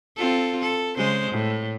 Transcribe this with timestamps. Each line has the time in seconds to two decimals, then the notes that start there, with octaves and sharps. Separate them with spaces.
0.16 C4 F4 A4
0.61 A4
0.97 C#3 G#3 C5
1.31 A2